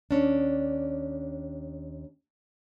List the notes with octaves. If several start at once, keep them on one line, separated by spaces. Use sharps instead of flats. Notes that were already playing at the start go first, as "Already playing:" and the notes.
D#2 C#4 D4